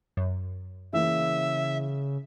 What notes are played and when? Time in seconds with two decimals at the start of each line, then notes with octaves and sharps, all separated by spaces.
0.17 F#2
0.93 C#3 E3 A#3 E5